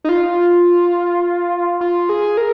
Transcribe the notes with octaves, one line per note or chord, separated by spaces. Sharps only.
D#4
F4
F4
G#4
A#4